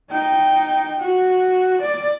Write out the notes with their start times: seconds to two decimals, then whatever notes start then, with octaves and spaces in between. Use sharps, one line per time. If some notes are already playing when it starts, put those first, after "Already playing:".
0.10 D#4 G5
0.99 F#4
1.81 D5